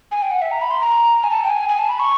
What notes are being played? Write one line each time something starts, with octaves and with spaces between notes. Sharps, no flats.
G#5
G5
F#5
E5
A#5
B5
C6
A#5
G#5
A5
G5
G#5
G#5
A5
B5
C#6